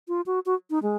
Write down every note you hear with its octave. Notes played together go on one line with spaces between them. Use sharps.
F4
F#4
F#4
D#4
G#3